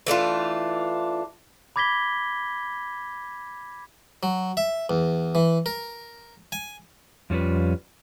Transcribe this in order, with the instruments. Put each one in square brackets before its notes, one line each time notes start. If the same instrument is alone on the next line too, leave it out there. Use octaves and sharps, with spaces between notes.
[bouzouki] E3 A3 D4 F4
[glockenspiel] B5 D6 G#6 A#6 B6 G7
[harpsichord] F#3
E5
E2
E3
A#4
G#5
[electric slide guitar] F2 G3 C#4 F4 B4